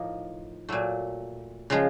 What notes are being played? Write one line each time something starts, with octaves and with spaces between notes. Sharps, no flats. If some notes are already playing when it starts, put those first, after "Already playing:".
Already playing: A2 F3 A#3 D#4
A#2 F#3 A3
C#3 F3 G#3